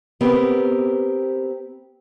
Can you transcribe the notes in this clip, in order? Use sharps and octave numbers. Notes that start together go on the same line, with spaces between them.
B3 C4 G4 A#4